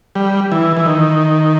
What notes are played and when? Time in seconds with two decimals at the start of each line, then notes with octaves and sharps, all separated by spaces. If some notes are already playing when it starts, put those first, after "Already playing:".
0.15 G3
0.52 E3
0.77 E3
0.86 D#3